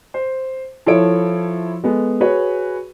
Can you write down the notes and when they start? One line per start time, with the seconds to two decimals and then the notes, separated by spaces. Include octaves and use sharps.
0.14 C5
0.86 F3 E4 A4 C#5 D7
1.84 G#3 B3 A4
2.20 F#4 G#4 B4 C#5